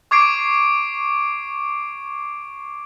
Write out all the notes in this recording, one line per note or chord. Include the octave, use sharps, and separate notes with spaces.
C#6 D6 G#6 C7 D7